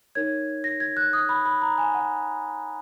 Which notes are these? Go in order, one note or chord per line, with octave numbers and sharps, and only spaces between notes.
D#4 A#4 C#5 G#6
A#6
G#6
F#6
D#6
B5
B5
A#5
G#5
F#5